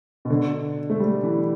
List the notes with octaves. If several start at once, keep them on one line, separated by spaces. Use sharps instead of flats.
B2
D3
A3
G3
E3